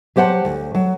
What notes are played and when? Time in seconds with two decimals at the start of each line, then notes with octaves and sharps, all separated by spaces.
0.16 F#3 G4 C5 F#5 A5
0.45 D2
0.75 F#3